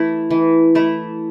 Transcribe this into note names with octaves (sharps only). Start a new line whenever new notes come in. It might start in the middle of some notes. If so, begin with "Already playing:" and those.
Already playing: E3 A3 E4
E3
A3 E4